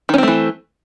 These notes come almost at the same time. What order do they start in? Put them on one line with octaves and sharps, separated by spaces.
D#3 C#4 C4 A3 E3